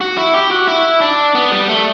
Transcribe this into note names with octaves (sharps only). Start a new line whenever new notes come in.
F#4
E4
G4
F#4
E4
D4
B3
G3
A3